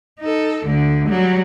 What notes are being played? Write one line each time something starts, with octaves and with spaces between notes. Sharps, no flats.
D#4 A4
D2 D3
F#3 G3